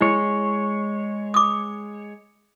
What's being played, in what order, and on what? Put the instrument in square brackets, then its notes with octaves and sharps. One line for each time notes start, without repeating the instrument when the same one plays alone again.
[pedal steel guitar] G#3 C#5 [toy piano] E4
[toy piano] D6 D#6